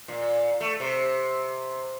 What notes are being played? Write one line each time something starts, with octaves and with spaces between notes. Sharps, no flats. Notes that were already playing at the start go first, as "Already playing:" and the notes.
A#2
A3
C3